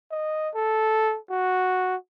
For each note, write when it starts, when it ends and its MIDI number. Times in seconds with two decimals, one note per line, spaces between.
0.11 0.50 75
0.55 1.18 69
1.30 1.96 66